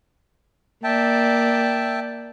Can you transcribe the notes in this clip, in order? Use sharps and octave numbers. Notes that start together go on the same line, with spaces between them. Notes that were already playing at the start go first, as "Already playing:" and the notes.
A#3 D5 E5 G5 A5